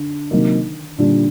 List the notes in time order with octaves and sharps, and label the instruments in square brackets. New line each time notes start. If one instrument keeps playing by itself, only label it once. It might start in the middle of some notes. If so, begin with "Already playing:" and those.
Already playing: [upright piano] D3
[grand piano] C3 F#3 A#3 D#4 [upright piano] D#3
[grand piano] A#2 G3 D4 [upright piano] D3